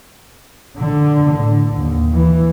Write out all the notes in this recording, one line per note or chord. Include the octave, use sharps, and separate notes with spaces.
D3
A2 D3
D#2
E3